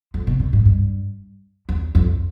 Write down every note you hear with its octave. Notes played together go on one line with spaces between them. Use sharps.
F2
B2
A#2
G#2
G2
E2
F2